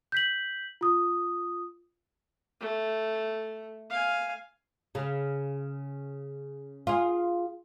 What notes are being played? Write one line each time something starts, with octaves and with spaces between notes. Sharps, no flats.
G6 B6 F#7
F4 D#6
A3
F5 G#5
C#3
F4 G#4